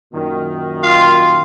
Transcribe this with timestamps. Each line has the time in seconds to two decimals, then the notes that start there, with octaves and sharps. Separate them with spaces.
0.13 F#2 A#2 D#3
0.84 F4 F5